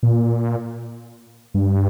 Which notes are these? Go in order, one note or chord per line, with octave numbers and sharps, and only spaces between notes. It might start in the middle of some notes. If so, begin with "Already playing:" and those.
A#2
G2